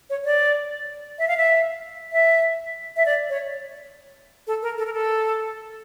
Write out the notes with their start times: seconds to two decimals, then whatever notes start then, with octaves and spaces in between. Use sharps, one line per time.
0.10 C#5
0.25 D5
1.18 E5
1.28 F5
1.37 E5
2.12 E5
2.96 E5
3.06 D5
3.29 C#5
4.47 A4
4.62 A#4
4.78 A4
4.87 A#4
4.93 A4